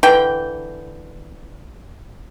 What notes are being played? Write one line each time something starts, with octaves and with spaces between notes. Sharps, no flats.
D3 E3 G5